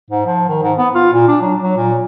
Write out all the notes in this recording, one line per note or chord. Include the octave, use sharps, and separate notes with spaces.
G#2
F3
D#3
G#2
B3
F4
A#2
D4
F#3
F#3
A#2